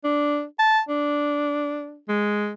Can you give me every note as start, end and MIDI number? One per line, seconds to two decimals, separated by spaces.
0.04 0.44 62
0.59 0.80 81
0.89 1.99 62
2.09 2.53 56